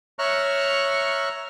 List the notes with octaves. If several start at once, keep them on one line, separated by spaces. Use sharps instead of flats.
C#5 E5 A#5 C#6 F6 F#6